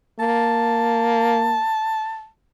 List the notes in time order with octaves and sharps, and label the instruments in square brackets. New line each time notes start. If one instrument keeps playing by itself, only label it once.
[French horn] A#3 [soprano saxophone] A5